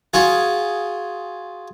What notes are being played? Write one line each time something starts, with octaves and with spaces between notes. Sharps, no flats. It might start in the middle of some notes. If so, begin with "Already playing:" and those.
F4 F#4 G#4